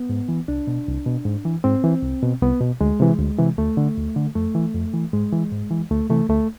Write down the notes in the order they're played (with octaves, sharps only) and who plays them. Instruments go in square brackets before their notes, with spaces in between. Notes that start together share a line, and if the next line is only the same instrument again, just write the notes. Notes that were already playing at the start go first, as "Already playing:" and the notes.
Already playing: [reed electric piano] B3
G#2
E3
C2 D4
B2
C2
B2
G#2
E3
G#2 C4
E3
C2
B2
C2 B3
B2
D2 G#3
C3 E3
D2
C3 E3
D2 A3
D3
D2
D3
F2 A3
E3
F2
E3
G#2 G#3
E3
G#2
E3
D2 A3
C3 E3 A3
D2 A3